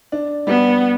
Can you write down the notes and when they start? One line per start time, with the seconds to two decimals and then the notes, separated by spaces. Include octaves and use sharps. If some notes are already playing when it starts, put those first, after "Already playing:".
0.12 D4
0.47 G3 B3